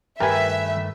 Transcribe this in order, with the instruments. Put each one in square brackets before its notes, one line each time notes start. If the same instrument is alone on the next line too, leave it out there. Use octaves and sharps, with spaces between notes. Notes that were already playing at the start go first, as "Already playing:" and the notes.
[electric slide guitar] G2 D#3 A3 [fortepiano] G4 B4 [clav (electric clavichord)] A#4 G#5 [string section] E5